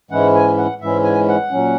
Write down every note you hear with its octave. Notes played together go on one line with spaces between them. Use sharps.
G#2 E3 G#3 C#4 E4 F#5
G#5
F#5
G#2 E3 G#3 C#4 E4 E5
G#5
F#5
A#2 F#3 C#4